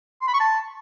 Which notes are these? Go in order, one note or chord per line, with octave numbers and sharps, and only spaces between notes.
C6
B5
C#6
A5